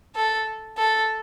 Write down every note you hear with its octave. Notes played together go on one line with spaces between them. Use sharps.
A4
A4